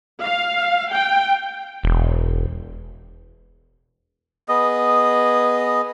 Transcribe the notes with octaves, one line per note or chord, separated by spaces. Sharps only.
F5
G5
E1
B3 G#4 D#5